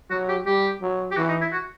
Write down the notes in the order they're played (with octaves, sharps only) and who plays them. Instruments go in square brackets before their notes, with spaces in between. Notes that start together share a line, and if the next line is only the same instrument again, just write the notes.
[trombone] F#3 [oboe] F#4
[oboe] G4
[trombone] G3 [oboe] G4
[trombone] F#3
[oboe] G4
[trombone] E3 [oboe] F#4
[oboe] D#4
E4
F#4